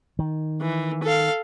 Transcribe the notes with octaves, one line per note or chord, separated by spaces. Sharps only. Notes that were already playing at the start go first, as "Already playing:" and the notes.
D#3
E3
A4 F5